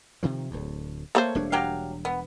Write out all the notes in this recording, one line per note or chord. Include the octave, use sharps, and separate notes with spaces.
C3 D#3 F3
D1 D2
A3 A#3 A#4 C5 C#5
E1 G3 D4
F#3 G4 F5
B3